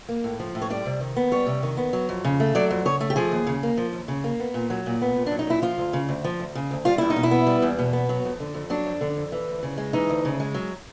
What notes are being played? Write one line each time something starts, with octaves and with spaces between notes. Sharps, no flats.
A#3
A2
F3
A2
C#5
G3 D5
C3
D#3
B3
G3 C#5
C3
D#3
B3
F#3
F2
C#3
A3
F#3 D5
F2
C#3 C#5
A3
G4
F3 G#4
D#2
C#3
A#3
F3
D#2
C#3
A#3
B3
A#2
F#3
A#2
B3
A#2
D4
F#3
D#4
A#2 E4
F3 F4
D2
C#3
D2
F3
D2
C#3
D2
G3 F4
E2 E4
D#4
B2
E4
B3
G3
E2
B2
B3
F#3
F2
D3
F2
F#3 D4
F2
D3
F2
E3
D2
C#3
G#3
E3 D#4
D2
C#3
G#3
F#3